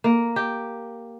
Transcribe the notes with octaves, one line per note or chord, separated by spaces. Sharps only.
A#3
G4